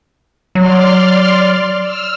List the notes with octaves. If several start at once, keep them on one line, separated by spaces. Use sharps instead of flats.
F#3 D5 C6 F6
E6 F6